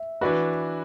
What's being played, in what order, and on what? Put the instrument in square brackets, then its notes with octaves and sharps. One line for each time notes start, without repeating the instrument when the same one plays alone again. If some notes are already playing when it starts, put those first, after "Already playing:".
Already playing: [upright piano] E5
[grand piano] E3 D4 F#4 [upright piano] B4